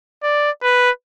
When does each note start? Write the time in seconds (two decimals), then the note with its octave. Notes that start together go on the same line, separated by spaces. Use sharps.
0.23 D5
0.63 B4